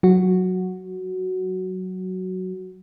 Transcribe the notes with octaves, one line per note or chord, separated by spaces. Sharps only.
F#3 F#4